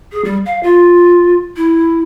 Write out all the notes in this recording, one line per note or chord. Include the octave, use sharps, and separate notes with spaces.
G#4
G3
F5
F4
E4